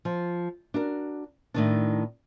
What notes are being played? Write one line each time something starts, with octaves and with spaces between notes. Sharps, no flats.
F3
D4 F#4 A#4
A2 D#3 D4